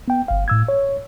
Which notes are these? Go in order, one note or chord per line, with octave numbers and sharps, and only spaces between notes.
B3 G5
G1 F5
A2 E6 G#6
C#5